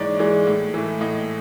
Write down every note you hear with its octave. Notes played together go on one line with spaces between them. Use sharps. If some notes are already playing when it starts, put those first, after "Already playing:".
Already playing: G#2 E3 G#3 C#5 D5
E3 G#3
A2
E3 A3
A2 D#5